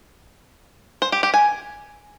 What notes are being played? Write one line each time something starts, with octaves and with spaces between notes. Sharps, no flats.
C5
G4
G4
G#5